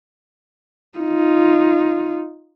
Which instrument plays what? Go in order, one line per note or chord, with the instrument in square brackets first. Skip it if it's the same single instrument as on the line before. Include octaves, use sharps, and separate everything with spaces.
[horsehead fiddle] D#4 F4